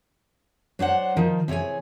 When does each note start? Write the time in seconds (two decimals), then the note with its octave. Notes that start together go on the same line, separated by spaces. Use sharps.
0.79 F#3 D4 C5 F#5
1.17 D#3 F3 D#4
1.48 C3 E3 G#4 C#5 G#5